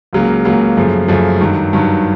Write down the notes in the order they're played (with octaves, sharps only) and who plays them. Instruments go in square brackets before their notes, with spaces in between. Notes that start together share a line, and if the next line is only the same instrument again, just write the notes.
[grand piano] C#2 C#3 F#3 A#3
C#2 C#3 F#3 A#3
F#2 C#3 F3 A3
F#2 C#3 F3 A3
G2 D#3 F#3
G2 D#3 F#3